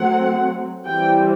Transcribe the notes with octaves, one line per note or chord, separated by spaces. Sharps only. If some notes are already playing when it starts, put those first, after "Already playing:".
Already playing: F#3 A3 C4 F#5
E3 G3 C4 G5